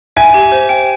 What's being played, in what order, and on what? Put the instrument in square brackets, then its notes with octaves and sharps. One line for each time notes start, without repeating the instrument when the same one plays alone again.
[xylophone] E5 [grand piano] G#5
[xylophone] G4
C5
G5